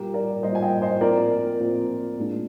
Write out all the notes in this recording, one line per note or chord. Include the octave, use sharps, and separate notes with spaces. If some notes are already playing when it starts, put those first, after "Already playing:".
Already playing: A#2 G3 A#3 G4 A#4
A#4 D5
A#2 G3 A#3 C5 D#5
G#5
D#5 G5
C5 D#5
A#2 F3 C4 A#4 D5
A#2 F3 C4
A#2 G#3 D4